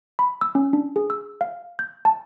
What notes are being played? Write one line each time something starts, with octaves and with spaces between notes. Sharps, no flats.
B5
E6
C#4
D4
G#4
E6
F5
G6
A5